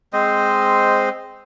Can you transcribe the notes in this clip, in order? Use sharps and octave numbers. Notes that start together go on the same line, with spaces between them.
G#3 C4 C5 D#5